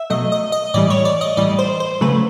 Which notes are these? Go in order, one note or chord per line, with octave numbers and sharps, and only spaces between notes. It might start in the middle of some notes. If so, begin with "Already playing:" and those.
Already playing: E5
B2 F#3 A3 D#5
D#5
D#5
A2 E3 G3 D5
C#5
D5
D#5
A2 E3 G3 D5
C5
C5
C#3 F#3 A3 B4